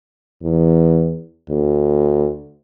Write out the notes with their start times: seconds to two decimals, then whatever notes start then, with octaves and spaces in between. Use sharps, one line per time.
0.43 E2
1.49 D2